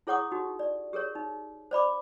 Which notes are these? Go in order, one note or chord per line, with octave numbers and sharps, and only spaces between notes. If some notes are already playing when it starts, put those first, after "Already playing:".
E4 G#4 C#5 F#5 C#6 D#6
D#4 F#4 G4
D5
G4 G#4 A#4 C#5
D#4
C5 D5 B5 D6